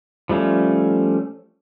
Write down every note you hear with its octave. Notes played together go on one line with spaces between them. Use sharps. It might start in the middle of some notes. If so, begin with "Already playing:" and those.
F3 G3 A3 C#4